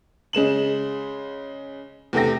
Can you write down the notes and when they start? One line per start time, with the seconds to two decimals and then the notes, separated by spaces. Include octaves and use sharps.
0.33 C#3 G#3 E7 F#7
2.13 E2 C3 A3 G5 A#6